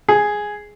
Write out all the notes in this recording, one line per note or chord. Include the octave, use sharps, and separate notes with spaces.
G#4